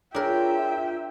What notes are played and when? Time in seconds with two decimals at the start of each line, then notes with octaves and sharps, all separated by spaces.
0.15 D4 F4 G#4 A#4 C#5 E5 G5 A#5